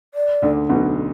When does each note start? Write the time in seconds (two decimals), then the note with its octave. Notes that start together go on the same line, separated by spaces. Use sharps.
0.14 D5
0.42 D2 D3
0.69 B1 B2